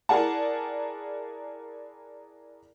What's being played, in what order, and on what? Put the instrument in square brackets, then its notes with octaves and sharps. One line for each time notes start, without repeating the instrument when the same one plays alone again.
[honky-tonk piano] E4 G#4 A#4 D5 F#5 A5